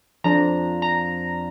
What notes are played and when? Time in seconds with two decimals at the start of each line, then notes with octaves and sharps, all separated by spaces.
0.24 F2 F3 D4 A#5
0.82 A#5